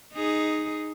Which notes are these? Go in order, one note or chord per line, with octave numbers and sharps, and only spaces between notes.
D#4 G#4